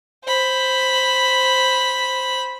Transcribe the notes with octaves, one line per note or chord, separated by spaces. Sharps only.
C5 B5